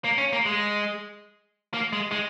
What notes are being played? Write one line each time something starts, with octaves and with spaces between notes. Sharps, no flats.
A#3
C#4
A#3
G#3
A#3
G#3
G#3